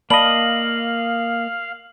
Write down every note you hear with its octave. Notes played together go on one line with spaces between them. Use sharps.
A#3 D5 D#5 F5 A5 B5 F#7